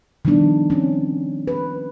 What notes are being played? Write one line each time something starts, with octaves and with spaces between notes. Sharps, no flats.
D#3 F3 G3 B3 D4
C4 C#4
B4